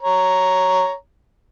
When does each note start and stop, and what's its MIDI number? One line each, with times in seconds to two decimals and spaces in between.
0.02 0.93 73
0.02 0.93 82